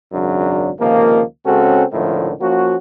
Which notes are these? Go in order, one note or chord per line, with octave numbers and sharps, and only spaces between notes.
G#1 F#2 C#3 F#3 D4
C#2 C3 D#3 F3 A#3
C#3 G#3 C4 C#4 F#4 A4
C#2 A2 D3 D#3 F3 A3
F3 A#3 C#4 F#4